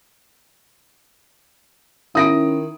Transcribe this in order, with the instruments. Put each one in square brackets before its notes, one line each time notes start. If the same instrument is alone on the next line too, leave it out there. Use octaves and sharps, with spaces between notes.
[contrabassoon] D#3 [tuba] C#4 [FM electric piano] E4 [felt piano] D#6 A#6 D7